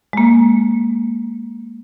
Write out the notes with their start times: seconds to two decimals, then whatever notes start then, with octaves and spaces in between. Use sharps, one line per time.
0.13 G#3 A#3